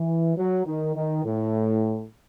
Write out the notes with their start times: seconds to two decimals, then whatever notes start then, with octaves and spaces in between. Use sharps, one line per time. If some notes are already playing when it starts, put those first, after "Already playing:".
Already playing: E3
0.37 F#3
0.66 D#3
0.95 D#3
1.24 A2